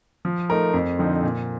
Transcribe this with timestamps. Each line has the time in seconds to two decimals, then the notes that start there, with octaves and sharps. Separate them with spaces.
0.25 F3
0.50 A3 D#4 A#4
0.73 F2
0.99 D3 F3 C4 D#4
1.23 A#2